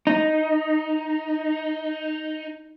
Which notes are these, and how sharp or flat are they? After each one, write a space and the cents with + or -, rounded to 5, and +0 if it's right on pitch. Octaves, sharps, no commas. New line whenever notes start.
D#4 +0